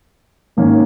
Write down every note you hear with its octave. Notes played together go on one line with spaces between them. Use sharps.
G#2 D#3 A#3 C#4